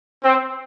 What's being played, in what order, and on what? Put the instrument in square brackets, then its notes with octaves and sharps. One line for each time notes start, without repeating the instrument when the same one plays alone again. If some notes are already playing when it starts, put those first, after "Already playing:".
[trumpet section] C4